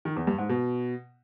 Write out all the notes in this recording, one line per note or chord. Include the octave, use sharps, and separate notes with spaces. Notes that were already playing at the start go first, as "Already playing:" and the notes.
D#3
E2
G2
G#2
B2